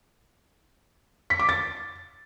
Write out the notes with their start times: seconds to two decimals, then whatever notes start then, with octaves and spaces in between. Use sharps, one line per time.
1.30 B6
1.39 D6
1.49 A6